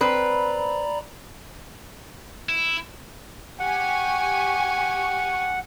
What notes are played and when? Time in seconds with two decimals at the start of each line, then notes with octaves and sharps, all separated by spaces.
0.01 C4 B4 D5 A#5 B5
2.49 E4
3.60 G4 F#5 G#5 C#6